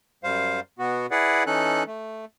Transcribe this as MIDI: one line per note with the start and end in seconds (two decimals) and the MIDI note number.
0.24 0.60 42
0.24 0.60 55
0.24 0.60 72
0.24 0.60 77
0.79 1.06 47
0.79 1.06 59
0.79 1.06 66
1.11 1.43 64
1.11 1.43 68
1.11 1.43 71
1.11 1.43 74
1.11 1.43 78
1.47 1.83 52
1.47 1.83 61
1.47 1.83 63
1.47 1.83 69
1.47 1.83 90
1.87 2.25 57